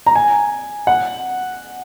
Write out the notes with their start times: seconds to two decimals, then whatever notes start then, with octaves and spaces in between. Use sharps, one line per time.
0.06 A#5
0.15 G#5
0.87 F#5